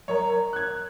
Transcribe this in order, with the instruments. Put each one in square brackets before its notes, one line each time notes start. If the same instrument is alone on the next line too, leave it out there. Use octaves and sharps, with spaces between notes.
[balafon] F#3 A#4 A#5 [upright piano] C#5
[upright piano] F#6 G#6